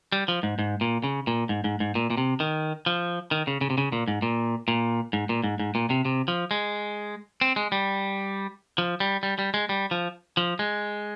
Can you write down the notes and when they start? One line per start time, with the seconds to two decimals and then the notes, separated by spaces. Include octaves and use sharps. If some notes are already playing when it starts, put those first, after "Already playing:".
0.12 G3
0.28 F3
0.43 G#2
0.59 G#2
0.81 A#2
1.04 C#3
1.27 A#2
1.49 G#2
1.64 G#2
1.80 G#2
1.95 A#2
2.10 A#2
2.17 C3
2.40 D#3
2.86 F3
3.31 D#3
3.47 C#3
3.61 C#3
3.70 C3
3.78 C#3
3.92 A#2
4.08 G#2
4.22 A#2
4.68 A#2
5.13 G#2
5.29 A#2
5.44 G#2
5.59 G#2
5.75 A#2
5.90 C3
6.05 C3
6.28 F3
6.51 G#3
7.41 C4
7.56 G#3
7.72 G3
8.78 F3
9.00 G3
9.23 G3
9.39 G3
9.54 G#3
9.69 G3
9.91 F3
10.37 F3
10.59 G#3